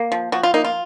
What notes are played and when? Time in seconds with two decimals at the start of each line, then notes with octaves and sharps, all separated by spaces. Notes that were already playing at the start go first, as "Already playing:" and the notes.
Already playing: A#3
0.12 F3
0.32 F3 F#4
0.43 F4
0.54 A#3 D#4
0.64 F4